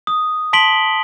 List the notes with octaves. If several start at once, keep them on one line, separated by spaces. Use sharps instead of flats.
D#6
A5 C6 B6 D7 F#7 G7